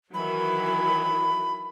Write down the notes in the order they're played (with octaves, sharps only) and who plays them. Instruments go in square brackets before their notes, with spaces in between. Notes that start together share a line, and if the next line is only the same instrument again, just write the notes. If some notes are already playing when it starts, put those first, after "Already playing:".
[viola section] D#3 E3 F#3 [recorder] B5